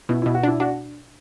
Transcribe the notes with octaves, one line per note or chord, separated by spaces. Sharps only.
B2 E4
B2 E4
F#4
D4 E4
D4 F#4